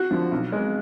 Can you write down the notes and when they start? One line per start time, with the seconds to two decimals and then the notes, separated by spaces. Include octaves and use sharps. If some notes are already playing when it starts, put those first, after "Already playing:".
Already playing: F#4
0.11 D3 F3
0.32 B1
0.52 B2 G#3